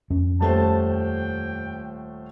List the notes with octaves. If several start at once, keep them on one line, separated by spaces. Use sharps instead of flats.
F2 C#4
D#1 A3 C5 A5
G5